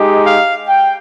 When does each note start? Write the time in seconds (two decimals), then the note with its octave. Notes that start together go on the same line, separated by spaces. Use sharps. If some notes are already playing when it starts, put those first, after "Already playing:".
Already playing: G#3 D#4 G4
0.24 F5
0.67 G5